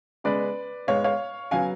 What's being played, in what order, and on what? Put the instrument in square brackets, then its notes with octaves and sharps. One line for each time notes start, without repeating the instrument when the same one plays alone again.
[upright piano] C#3 G#3 B3 B4 D5
G#2 G#3 B3 C#5 F5
C#5 F5
C#3 F#3 B3 F5 G#5